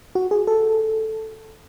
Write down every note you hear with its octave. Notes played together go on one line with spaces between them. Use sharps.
F#4
G#4
A4